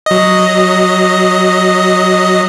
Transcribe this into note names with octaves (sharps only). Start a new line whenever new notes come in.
F#3 D#5